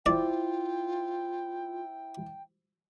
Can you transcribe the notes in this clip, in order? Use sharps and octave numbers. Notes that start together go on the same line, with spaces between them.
E4 F4 C5 D5 G5